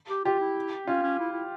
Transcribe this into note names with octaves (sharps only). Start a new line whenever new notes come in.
G4
F4 G4
E4
C#4 F4
C#4
E4
E4